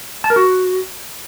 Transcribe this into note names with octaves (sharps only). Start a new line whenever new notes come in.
A5
A#4
F#4